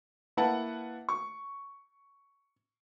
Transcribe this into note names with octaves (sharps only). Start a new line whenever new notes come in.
A#3 E4 B4 F#5 A5
C#6